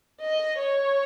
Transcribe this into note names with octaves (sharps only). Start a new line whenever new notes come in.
D#5
C#5